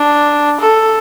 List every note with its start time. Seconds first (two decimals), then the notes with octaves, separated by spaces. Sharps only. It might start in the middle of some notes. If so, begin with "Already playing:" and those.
Already playing: D4
0.60 A4